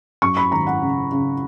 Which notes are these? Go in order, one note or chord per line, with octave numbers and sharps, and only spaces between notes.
F#2 C#6
B5
G#1 A#5
F#5
C#3
C#3